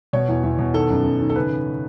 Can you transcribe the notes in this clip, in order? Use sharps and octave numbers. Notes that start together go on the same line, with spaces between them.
B2 C#5
E2
E2
B2
D#3 A4
F#2
F#2
D#3
A4
C#3 B4